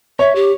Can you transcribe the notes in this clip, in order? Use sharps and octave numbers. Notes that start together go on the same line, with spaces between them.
C#5 E5
G4